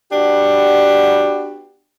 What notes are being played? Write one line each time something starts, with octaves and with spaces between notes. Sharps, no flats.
B3 D4 F#4 G4